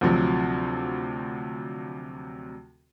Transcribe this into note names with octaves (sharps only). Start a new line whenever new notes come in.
D2 C3 F3 F#3